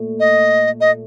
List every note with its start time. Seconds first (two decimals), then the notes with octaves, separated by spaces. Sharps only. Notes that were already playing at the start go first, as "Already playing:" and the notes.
Already playing: A#2 A3
0.20 D#5
0.81 D#5